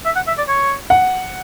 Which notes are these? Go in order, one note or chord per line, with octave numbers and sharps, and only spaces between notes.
E5
F#5
E5
D5
C#5
F#5